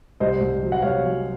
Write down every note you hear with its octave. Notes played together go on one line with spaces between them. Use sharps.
C2 C5 D#5
C2
F#3
F#5
C2 C#5 F5
F#3